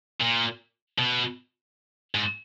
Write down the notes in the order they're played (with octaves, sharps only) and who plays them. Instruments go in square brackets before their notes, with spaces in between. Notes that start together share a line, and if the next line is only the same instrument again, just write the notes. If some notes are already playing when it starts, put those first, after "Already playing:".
[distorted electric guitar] A#2
B2
G#2